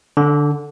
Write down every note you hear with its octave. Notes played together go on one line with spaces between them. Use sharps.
D3